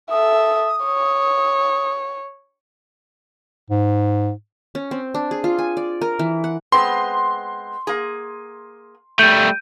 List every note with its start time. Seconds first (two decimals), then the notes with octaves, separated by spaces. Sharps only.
0.11 A4 E5 D#6
0.84 C#5
3.70 G#2
4.75 C#4
4.91 C4
5.14 D4
5.31 G#4
5.44 F4
5.58 G#5
5.77 D5
6.01 A#4
6.19 E3
6.44 F#5
6.72 G#3 B3 C4 C6
7.87 A#3 G#4
9.19 G3 A3 G6 D7 D#7